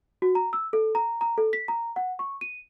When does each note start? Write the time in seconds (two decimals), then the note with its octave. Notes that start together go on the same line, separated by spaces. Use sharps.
0.22 F#4
0.35 A#5
0.53 E6
0.73 A4
0.95 A#5
1.21 A#5
1.38 A4
1.53 B6
1.68 A#5
1.96 F#5
2.19 C#6
2.41 D#7